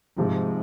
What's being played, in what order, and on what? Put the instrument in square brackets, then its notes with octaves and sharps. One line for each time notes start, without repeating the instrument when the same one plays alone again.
[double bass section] G#2 [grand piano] C3 F3 G#3